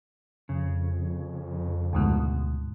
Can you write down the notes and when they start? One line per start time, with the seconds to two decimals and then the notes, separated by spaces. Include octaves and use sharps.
0.49 F2 C#3
1.93 D2 G#2 B2